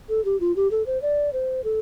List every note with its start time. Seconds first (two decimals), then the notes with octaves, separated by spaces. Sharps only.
0.09 A4
0.25 G4
0.40 F4
0.56 G4
0.71 A4
0.86 C5
1.02 D5
1.33 C5
1.64 A4